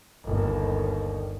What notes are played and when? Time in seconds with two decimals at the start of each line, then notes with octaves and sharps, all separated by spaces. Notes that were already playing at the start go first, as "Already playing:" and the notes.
0.25 G1 D#2